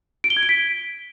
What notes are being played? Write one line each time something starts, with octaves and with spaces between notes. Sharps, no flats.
D7
G7
G#6
D7
B6